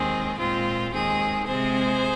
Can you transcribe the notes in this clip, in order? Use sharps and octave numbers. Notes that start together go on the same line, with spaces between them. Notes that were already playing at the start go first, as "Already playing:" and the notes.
Already playing: D#2 D#3 G#3 C4 G#4
A#2 G#3 C4 F4
D#2 D#3 G#3 C4 G#4
C3 G#3 C4 G#4 C5